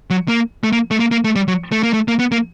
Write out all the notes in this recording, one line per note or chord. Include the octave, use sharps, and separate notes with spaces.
F#3
A#3
A3
A#3
A3
A#3
A#3
A3
G3
F#3
A3
A#3
A3
A#3
B3
A#3